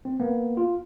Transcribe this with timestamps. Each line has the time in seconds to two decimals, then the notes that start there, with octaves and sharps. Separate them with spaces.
0.05 C4
0.20 A#3 B3
0.57 F4